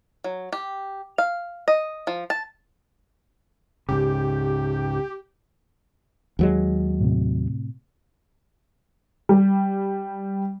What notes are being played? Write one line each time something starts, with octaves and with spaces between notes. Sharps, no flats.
F#3
G4
F5
D#5
F3
A5
C#2 G#2 C#3 G4
D#2 F#3 G#3
A2 C3
G3